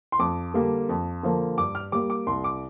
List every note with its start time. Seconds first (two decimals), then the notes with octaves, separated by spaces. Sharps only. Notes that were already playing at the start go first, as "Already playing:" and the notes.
0.12 C6
0.19 F2 D6
0.54 D3 G3 A#3
0.89 F2
1.23 D3 F3 A#3
1.58 G2 D6
1.75 F6
1.92 G3 A#3 D6
2.10 D6
2.27 C2 C6
2.44 D6